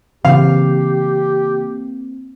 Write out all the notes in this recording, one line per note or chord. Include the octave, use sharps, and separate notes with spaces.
C#3 E3 A#3 C4 G4 F5